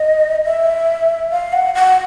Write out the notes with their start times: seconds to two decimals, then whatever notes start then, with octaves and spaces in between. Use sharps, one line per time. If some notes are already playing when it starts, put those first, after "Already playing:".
Already playing: D#5
0.45 E5
1.31 F5
1.53 F#5
1.75 F#5